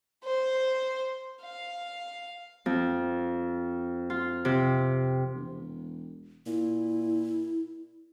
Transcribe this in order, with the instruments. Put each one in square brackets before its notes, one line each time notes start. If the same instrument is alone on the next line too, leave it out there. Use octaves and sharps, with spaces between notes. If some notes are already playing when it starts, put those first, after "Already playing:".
[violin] C5
F5
[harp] F2
F4
C3
[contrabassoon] E1
[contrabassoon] A#2 [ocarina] E4